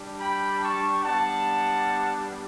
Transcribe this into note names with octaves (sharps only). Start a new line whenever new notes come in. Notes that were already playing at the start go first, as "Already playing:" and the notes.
Already playing: G3 D4 G4
G5 B5
A5 C#6
G3 B3 D4 G4 F#5 A5